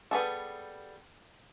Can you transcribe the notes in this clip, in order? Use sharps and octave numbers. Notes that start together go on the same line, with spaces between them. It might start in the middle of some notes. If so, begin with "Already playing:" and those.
G3 B3 G#4 A4